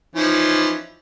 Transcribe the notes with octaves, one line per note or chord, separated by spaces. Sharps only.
E3 F3 C#4 D#4